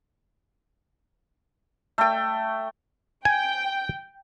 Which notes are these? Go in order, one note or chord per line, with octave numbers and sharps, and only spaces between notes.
A3 G5
G5 G#5